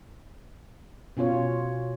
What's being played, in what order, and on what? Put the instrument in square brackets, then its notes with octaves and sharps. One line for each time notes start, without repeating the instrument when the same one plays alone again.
[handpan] B2 C#4 F4 C#5